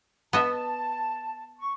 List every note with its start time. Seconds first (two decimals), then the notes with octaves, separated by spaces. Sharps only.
0.33 B3 D#5 E5 A5
1.58 C#6